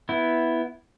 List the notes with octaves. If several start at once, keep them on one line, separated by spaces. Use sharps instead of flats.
B3 E4